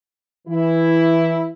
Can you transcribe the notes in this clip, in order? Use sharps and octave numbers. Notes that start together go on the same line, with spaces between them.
E3 E4